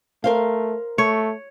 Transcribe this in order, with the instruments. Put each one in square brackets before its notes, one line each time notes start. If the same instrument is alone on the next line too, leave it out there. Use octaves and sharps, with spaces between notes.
[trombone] A3 [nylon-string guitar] A#4 C5 F5
[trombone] A3 [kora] C#5